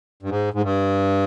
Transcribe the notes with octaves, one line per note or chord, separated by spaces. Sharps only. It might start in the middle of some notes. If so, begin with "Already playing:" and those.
G2
G#2
G#2
G2